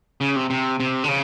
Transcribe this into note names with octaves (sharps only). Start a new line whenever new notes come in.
C#3
C3
C3
C3
D3
C#3